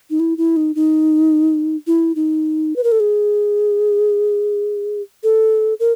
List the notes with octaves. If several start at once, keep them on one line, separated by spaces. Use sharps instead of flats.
D#4
E4
E4
D#4
D#4
E4
D#4
B4
A#4
A4
G#4
A4
A#4